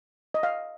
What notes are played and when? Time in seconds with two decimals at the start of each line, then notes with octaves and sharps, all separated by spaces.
0.34 D#5
0.43 F5